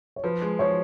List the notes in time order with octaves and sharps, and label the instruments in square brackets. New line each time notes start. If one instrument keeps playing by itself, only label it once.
[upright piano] C#5
[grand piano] F3 [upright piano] B4
[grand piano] G#3
[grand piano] F3 [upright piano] C#5